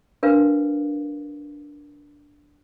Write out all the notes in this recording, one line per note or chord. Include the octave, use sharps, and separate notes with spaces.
D4 A#4 B4 F5